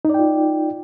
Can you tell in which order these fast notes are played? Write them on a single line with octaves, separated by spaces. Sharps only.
D#4 D5 G5 F4